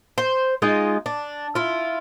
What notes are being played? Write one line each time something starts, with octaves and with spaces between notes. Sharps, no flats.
C5
G#3 D#4 F4 D#5
D4
E4 F4